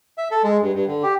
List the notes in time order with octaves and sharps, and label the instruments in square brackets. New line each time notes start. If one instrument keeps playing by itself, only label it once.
[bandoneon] E5
A4
G#3
G2
G2
D3
G4